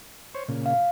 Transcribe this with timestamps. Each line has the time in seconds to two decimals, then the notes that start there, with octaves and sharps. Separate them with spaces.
0.35 C5 C#5
0.48 A#2 C#3
0.66 F5